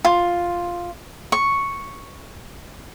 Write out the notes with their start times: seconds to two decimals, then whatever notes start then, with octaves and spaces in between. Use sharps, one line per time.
0.05 F4
1.32 C#6